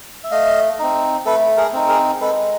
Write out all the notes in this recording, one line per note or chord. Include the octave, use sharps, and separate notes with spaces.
E5
A3 D#5 F5
C4 D#4
A3 A4 B4
G#4 A#4
C4 D#4
G#4 A#4
G#3 A4 B4